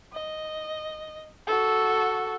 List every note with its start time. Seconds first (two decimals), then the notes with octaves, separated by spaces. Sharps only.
0.13 D#5
1.47 F#4 A4